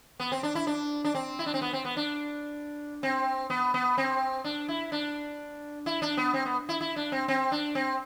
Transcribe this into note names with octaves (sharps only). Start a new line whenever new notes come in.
B3
C4
D4
E4
D4
D4
C4
E4
D4
C4
B3
C4
B3
D4
C4
B3
B3
C4
D4
E4
D4
E4
D4
B3
C4
B3
E4
E4
D4
C4
C4
D4
C4